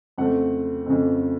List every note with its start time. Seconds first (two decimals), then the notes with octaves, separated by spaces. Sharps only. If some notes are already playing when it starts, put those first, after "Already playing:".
0.18 F2 C#3 A3 C4 F#5
0.86 F2 C#3 A3 C4